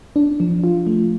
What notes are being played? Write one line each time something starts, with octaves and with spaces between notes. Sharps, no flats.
D4
F3
F4
A3